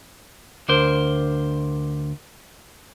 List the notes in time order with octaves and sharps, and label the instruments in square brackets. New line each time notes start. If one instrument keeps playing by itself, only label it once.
[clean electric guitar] D2 D4 A#4 C5